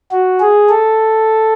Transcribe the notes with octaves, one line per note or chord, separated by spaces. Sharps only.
F#4
G#4
A4